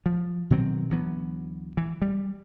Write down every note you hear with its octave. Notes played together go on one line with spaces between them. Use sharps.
F3
B2 D#3 F#3 C4
D2 E3 F#3 B3
E3
G3